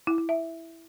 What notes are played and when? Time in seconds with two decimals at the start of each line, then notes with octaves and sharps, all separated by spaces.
0.07 E4
0.18 E4
0.29 E5